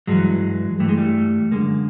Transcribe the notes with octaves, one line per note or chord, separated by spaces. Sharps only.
G2 E3 F#3 G#3
G2 E3 A3
G#3
G3 A3
F#2 D3 G#3 A#3